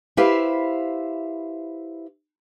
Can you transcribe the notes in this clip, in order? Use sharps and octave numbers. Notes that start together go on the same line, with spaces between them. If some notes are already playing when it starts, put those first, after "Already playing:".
E4 G4 B4 C5 E5 F5